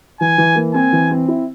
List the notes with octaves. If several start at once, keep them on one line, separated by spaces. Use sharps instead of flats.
E3 G#5
E3
A#3
C4 G#5
E3
C4
E4